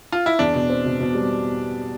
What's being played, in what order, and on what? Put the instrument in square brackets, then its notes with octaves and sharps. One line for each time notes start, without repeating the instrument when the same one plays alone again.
[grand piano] F4
E4
[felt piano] E2 [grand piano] D4
[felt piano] B2
C4
B2
B2
G3